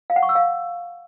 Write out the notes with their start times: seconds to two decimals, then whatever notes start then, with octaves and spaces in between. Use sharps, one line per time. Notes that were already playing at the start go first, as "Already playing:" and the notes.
0.10 F5
0.16 F#5
0.23 C#6
0.29 E6
0.35 F5